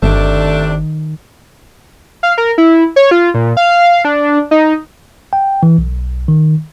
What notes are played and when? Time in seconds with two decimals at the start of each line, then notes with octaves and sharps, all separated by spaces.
0.03 G1 C3 D#3 A3 D4
2.23 F5
2.38 A#4
2.58 E4
2.96 C#5
3.11 F4
3.34 A#2
3.57 F5
4.05 D4
4.51 D#4
5.33 G5
5.63 E3
5.78 B1
6.28 D#3